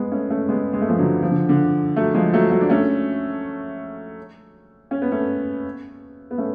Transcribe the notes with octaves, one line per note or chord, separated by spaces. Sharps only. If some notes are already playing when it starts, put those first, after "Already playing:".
Already playing: G#3 B3
A3 C#4
A3 C#4
G#3 B3
G#3
A3
F3 G#3
D3 F#3
F3
D3
D3
F#3 A3
F3 G#3
F#3 A3
F#3 A3
D4
A3 C#4
C#4
B3
A3 C#4
B3
A3 C#4